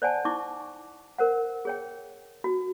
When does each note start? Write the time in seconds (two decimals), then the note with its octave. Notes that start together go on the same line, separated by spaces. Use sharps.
0.02 C5 D5 F#5 G#5 A5
0.25 D#4 E4 C#6 D6
1.18 A#4 C5 F#5
1.65 G#4 C#5 G5
2.44 F#4